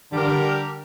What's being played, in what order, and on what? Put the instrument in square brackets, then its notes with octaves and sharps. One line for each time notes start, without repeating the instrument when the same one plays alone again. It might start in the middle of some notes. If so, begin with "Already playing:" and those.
[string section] D3 [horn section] G3 D4 G4 A#4